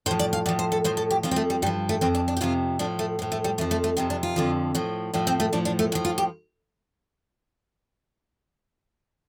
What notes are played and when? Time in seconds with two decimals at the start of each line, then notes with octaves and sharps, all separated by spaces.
0.06 A2 C5
0.11 F3
0.19 D5
0.33 F5
0.46 A2 D5
0.49 F3
0.59 C5
0.72 A4
0.84 A2 F3 C5
0.97 A4
1.11 G4
1.23 F2 F3 F4
1.31 C4
1.36 A3
1.50 G3
1.62 G2 G3
1.66 F3
1.89 A3
2.01 F2 F3 C4
2.15 D4
2.28 D4
2.37 G4
2.41 F2 C3 F3 F4
2.79 A2 F3 D4
2.99 A3
3.19 A2 F3
3.32 A3
3.44 G3
3.58 F2 A3
3.61 F3
3.71 A3
3.84 A3
3.97 F2 C3 F3 C4
4.10 D4
4.23 F4
4.36 F2 D3 F3
4.75 A2 F3
5.13 A2 F3 D4
5.27 C4
5.40 A3
5.53 A2 F3 D4
5.65 D4
5.79 A3
5.92 A2 F3
6.05 F4
6.18 G4